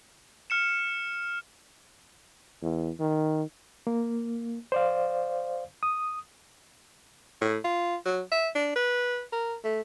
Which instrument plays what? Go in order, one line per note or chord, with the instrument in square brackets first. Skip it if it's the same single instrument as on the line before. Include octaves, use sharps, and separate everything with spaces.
[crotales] F6 C#7 E7
[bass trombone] E2
D#3
[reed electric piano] A#3
C5 D5 F5
D#6
[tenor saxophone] A2
F4
F#3
E5
D4
B4
A#4
A3